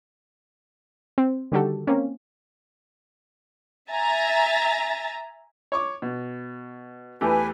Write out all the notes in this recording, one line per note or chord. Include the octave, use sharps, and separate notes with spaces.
C4
D3 D#3 G3 F#4 G4 A4
A#3 C4 C#4
E5 G#5 A#5 A6
C#5 C#6 D6
B2
E2 A3 G4 B4 G#5